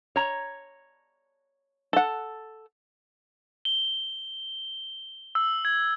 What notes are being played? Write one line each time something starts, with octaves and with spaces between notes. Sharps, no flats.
C#5 A#5
A4 F#5
G7
E6
G#6